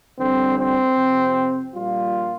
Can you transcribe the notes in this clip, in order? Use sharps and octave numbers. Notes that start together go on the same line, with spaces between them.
F2 D3 G3 C4
C4
F2 C3 F3
A#1 A#2 G3 F4